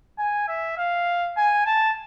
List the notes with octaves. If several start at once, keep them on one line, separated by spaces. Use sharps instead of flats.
G#5
E5
F5
G#5
A5